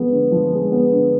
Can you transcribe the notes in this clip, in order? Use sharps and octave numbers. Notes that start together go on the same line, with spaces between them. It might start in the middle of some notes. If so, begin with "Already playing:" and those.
Already playing: F3 G#3 B3
D3
F3
G#3
B3
D3